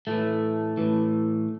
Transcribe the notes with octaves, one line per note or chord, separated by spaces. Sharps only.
A2 E3 A3
A2 E3